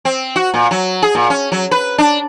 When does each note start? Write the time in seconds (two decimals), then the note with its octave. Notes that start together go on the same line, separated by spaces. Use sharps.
0.05 C4
0.36 F#4
0.54 A#2
0.71 F#3
1.02 G#4
1.15 A#2
1.30 C#4
1.52 F#3
1.71 B4
1.98 D4